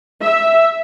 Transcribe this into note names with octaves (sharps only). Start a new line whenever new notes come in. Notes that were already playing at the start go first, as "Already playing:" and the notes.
E5